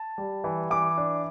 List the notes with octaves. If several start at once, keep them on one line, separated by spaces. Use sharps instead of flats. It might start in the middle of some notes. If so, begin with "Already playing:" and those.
Already playing: A5
G3
E3
E3 D6
D4